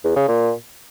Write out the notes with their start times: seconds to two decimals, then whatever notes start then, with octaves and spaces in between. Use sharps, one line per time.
0.04 E2
0.16 C#3
0.28 A#2